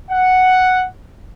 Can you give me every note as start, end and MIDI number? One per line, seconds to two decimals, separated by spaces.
0.11 0.86 78